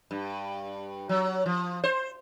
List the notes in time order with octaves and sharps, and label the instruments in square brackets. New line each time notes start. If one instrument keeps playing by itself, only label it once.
[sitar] G2
F#3
F3
C5